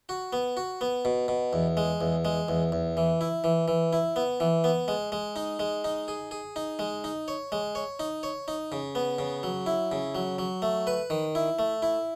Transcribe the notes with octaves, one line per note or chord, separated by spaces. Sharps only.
F#4
B3
F#4
B3
B2
B2
E2
G#3
E2
G#3
E2
E2
E3
E4
E3
E3
E4
B3
E3
B3
G#3
G#3
D#4
G#3
D#4
G#4
G#4
D#4
G#3
D#4
C#5
G#3
C#5
D#4
C#5
D#4
C#3
B3
C#3
F#3
E4
C#3
F#3
F#3
A3
B4
D#3
E4
A3
E4